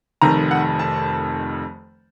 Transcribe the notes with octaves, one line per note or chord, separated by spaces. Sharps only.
F1 F2 D#3 A#5
F#5
A5